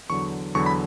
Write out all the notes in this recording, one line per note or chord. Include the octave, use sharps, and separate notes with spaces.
E2 D3 F#3 C#6
E2 D3 F#3 C#6
B5